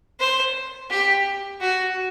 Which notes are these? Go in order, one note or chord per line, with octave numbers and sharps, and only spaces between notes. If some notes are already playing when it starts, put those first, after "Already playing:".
C5
G4
F#4